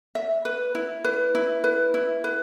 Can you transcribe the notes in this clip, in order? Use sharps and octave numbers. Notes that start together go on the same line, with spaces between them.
E5
B4
E4
B4
E4
B4
E4
B4